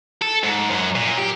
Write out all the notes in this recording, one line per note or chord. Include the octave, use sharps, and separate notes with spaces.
A4
G#2
F#2 F#3
A#2
G4